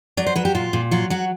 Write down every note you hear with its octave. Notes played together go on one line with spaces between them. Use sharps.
F#3 D5
C5
F#3 B4
G4
A#2 F4
A#2
F#3 F4
F#3 F#4